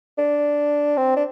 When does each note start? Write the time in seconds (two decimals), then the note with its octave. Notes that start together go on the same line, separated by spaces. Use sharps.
0.18 D4
0.97 C4
1.16 D4